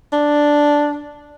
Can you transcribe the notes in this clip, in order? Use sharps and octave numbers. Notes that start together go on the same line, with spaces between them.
D4